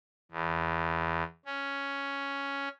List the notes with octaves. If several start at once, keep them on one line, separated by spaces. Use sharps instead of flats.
E2
C#4